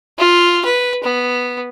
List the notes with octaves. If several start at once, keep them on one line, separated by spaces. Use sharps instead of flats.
F4
B4
B3